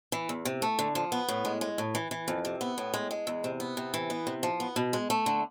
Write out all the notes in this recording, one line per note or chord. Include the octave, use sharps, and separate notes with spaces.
E3
E2
C3
A3
D3
F3
B3
A2
G#3
G#3
A2
E3
E3
F2
C3
B3
A2
G#3
G#3
E2
C3
B3
C3
E3
B3
C3
F3
B3
B2
G#3
A3
D3